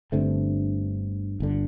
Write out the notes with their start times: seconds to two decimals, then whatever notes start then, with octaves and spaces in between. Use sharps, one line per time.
0.12 G1 G2 D3 A3 C4
1.40 G1 D3